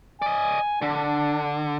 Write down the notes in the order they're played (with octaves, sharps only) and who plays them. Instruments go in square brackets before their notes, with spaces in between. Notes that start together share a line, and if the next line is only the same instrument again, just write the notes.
[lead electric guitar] D5 D#5 [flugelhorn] G#5
[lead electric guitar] D3 [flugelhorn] D4